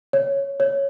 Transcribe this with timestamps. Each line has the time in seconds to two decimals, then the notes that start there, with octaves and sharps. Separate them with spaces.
0.13 C#5
0.60 C#5